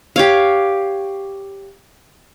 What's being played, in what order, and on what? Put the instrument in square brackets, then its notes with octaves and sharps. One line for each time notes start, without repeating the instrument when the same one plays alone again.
[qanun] G4 C#5 F5